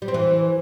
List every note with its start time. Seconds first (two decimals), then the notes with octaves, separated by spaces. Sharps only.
0.02 G3
0.08 C4
0.14 E3